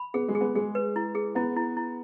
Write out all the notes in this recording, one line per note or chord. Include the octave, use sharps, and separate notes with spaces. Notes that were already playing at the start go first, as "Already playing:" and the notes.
Already playing: B5
B3 G#4
G#3
G#4
B3
G#3 G#4
B4
E4
G#4
B3 E4
E4
E4